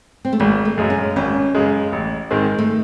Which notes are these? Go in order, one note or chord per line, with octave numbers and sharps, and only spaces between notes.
C4
A3
G#1 G#3
A3
F#2 C#3 G#3
C#4
G#1 C#4
F#2 C#3 G#3
A1
G#2 D#3 G#3 C4
A3